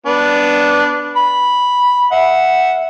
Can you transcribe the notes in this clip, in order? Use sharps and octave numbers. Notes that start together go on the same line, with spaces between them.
B3 D4
B5
E5 F#5